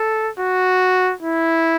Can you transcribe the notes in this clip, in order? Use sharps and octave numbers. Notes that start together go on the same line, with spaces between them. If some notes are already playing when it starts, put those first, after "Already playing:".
Already playing: A4
F#4
E4